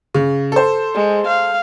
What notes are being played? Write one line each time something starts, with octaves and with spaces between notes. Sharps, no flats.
C#3
A4 C5
G#3
F5